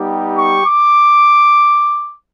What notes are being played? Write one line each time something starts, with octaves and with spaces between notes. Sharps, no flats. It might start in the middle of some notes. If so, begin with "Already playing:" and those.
Already playing: G3 B3 D#4 G4
C#6
D6